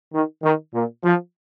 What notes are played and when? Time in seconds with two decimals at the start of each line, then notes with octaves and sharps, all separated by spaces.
0.13 D#3
0.43 D#3
0.74 A#2
1.04 F3